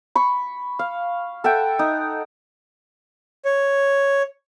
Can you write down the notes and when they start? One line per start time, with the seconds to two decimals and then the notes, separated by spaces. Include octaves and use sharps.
0.15 B5 C#6
0.79 F5
1.44 A4 E5 F#5 G5
1.79 D#4
3.45 C#5